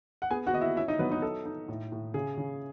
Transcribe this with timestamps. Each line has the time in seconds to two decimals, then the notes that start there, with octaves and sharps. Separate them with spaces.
0.22 F#5
0.30 B3 G#4 G#5
0.47 F#4 F#5
0.54 B3 D#5
0.61 E4 E5
0.77 C#4 E4 E5
0.88 D#4 D#5
0.99 F#3 B3 B4
1.12 D#4 D#5
1.22 D#4 A4
1.46 D#4
1.68 A2
1.92 A2
2.14 C#3 G#4
2.37 C#3